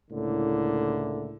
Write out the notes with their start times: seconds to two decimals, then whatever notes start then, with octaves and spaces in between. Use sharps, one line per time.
0.11 C#2 A2 D3 A#3 E4